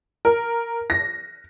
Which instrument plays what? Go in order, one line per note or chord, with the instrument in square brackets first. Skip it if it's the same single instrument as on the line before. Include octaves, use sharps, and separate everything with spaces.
[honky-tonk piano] A#4
A#6